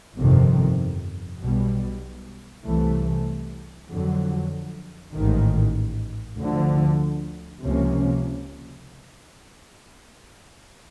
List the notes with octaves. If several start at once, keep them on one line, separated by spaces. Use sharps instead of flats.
G1 F2 C3 D#3
B1 B2 G3
C2 C3 E3 A3
F2 D3 F#3
A1 G#2 D#3
D2 D3 F3
C#2 C3 F3 A#3 C#4